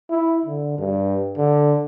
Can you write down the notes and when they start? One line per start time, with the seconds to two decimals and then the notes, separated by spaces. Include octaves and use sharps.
0.10 E4
0.45 D3
0.78 G2
1.38 D3